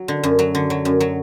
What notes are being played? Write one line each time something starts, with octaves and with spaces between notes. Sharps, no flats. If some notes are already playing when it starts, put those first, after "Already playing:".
Already playing: F#3
D3
F#2
F#3
D3
F#3
F#2
F#3